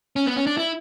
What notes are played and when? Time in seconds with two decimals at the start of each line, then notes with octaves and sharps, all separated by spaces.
0.16 C#4
0.26 B3
0.36 C#4
0.47 D4
0.57 E4